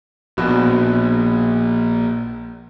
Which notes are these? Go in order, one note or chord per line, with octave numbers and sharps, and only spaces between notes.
A#1 B2